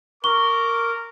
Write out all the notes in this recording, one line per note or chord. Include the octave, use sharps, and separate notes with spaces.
A#4 C#6 D6 G7